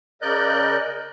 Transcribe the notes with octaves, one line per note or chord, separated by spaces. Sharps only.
C#3 A#4 D5 D#5 F#6 G6